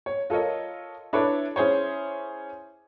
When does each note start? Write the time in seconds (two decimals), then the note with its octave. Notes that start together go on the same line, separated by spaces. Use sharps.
0.06 C#5
0.30 F4 A4 A#4 C#5 D#5
1.13 D4 E4 A4 B4 C#5 D5
1.56 C#4 E4 G#4 C5 C#5